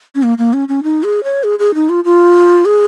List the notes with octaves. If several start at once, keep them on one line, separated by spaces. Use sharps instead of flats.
C#4
A#3
A#3
C#4
C#4
D#4
G#4
C#5
G#4
G#4
D#4
F4
F4
G#4